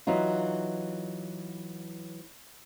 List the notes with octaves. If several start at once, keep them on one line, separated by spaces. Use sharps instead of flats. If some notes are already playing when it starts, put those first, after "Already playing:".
E3 F#3 D#4 F4